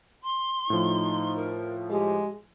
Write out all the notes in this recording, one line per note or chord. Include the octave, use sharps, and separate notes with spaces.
C6
A2 F3 D#4
A#4
G#3 G4